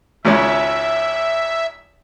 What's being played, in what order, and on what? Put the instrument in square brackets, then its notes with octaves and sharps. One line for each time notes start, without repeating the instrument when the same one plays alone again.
[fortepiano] G#1 C#2 C#4 [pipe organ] E5